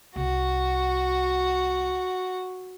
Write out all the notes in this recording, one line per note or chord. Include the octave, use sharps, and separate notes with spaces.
C2 F#4